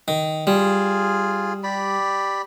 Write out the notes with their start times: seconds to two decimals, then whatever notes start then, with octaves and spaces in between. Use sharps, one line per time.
0.08 D#3
0.47 G3 F4 G#4
1.64 G4 D5 B5